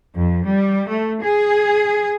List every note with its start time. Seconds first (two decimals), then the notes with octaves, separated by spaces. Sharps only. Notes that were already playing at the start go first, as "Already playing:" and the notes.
0.15 F2
0.45 G3
0.88 A3
1.22 G#4